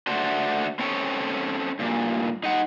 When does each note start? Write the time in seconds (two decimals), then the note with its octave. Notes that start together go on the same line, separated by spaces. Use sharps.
0.07 A3 D4 F#4 C5
0.79 C4 C#4 A4 C#5 G5
1.79 G2 A#2
2.44 D#4 F#5